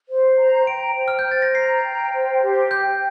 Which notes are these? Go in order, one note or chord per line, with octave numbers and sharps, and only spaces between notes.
C5
A#5
G5 D7
C5
F6
G6
C5
A6
A#6
A#5 C7
G5
C5
G4
G5 G6